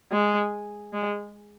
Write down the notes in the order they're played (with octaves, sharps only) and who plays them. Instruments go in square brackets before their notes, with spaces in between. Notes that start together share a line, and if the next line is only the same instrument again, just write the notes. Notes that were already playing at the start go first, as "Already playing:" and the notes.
[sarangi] G#3
G#3